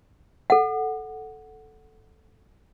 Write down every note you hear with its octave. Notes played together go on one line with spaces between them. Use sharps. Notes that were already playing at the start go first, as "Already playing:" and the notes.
A4 F#5